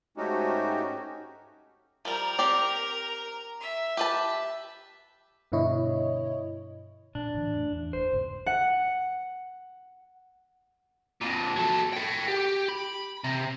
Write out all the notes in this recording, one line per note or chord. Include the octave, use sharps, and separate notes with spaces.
G#2 A3 C#4 D#4 F#4 G4
F3 G3 A#4 A#5
C4 G4 D5
E5
G4 B4 A5
G2 B2 D3 E4 C#5 D#5
A#2 D4
A2 D3 E3
F2 A3
E2
F#1 C5
E2 G#2 C#3
F#5
F2 A#2
F#3 A4
A4 G5
G4
B5
C3